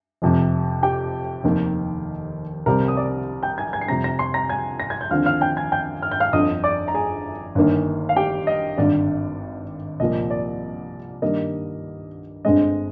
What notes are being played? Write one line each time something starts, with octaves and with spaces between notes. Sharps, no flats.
F1 F2 C3
G4 G5
F1 D#2 D#3 A#3
C2 C3 G3 C4 A#4 A#5
D#6
D5 D6
G5 G6
G#5 G#6
G#5 G#6
C7
F2 C3 G3 C4 A#5 A#6
A#5 A#6
C6 C7
A#5 A#6
G#5 G#6
A#6
G#6
G6
D#2 D3 F3 C4 F5 F6
F5 F6
G5 G6
G#5 G#6
G5 G6
F6
G6
F5 F6
G1 F2 D3 D#5 D#6
D5 D6
A#5
G#4 G#5
G1 G2 D#3 A#3
F5
G4 G5
D#5
G#1 G2 D3 D5
C2 A#2 F3 A#3 D#5
D5
G2 D#3 G3 A#3 D#5
G1 G2 D3 G#3 C4 D#5